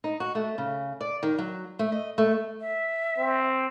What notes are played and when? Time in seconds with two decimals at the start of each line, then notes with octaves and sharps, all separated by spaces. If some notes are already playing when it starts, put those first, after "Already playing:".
0.04 D#4
0.20 F#4
0.35 A3
0.58 C#3
1.01 D5
1.23 D#3
1.38 F#3
1.79 A3
1.92 D#5
2.18 A3
2.61 E5
3.18 C4